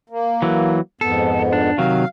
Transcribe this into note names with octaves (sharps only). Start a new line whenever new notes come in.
A#3
E3 F#3
F2 G#2 B3 A4
D4
C3 D#3 F#3 F5